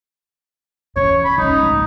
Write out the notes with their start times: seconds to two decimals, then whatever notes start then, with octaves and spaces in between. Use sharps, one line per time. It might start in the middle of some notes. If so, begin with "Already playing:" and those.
0.96 E2 C#3 C#5
1.25 B5
1.38 C#2 C#4 D#4
1.63 A#1 G#2